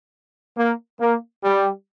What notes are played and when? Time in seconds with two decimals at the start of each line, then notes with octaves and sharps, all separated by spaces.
0.58 A#3
1.00 A#3
1.43 G3